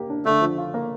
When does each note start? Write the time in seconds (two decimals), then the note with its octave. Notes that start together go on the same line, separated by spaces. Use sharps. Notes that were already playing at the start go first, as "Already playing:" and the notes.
Already playing: A#3 G4
0.09 D4
0.25 D3 A3
0.41 F3
0.58 F4
0.74 A#3